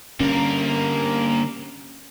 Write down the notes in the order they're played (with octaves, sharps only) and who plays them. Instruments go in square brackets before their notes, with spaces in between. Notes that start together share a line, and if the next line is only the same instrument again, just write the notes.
[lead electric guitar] D3 G3 [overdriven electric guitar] A#3 A#4 [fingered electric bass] C#4